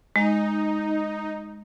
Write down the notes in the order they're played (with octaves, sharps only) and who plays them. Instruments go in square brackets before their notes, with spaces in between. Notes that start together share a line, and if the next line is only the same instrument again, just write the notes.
[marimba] G#3 [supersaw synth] D#4